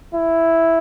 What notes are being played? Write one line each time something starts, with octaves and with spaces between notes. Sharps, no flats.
E4